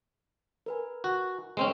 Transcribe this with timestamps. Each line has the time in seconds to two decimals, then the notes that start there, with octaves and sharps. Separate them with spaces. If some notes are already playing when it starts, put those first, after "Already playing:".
0.66 A#4 B4 G#5
1.04 F#4
1.57 G#3 C4 C#4 C5